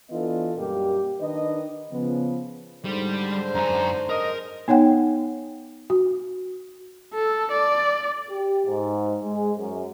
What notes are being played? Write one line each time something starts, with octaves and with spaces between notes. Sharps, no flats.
E3 B3 D4 F4 A4 D#5
F#2 A#2 G3 A#3 G4 A#4
D#3 D4 B4 D#5
C#3 F3 B3
G#2 D3 G3 C5
F#2 G#5 A#5
A#4 D#5
B3 D#4 C#5 F#5 G5
F#4
A4
D5
G4
G#2
G#3
F#2